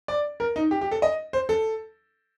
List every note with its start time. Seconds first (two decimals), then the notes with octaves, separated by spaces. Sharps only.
0.08 D5
0.40 A#4
0.56 D#4
0.71 G4
0.81 G4
0.91 A4
1.02 D#5
1.33 C5
1.49 A4